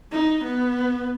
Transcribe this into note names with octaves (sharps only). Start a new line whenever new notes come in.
D#4
B3